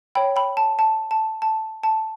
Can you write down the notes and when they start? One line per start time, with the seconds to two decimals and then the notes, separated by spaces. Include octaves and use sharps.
0.15 C#5 G5 B5
0.36 G5 B5
0.57 A5
0.79 A5
1.11 A5
1.42 A5
1.83 A5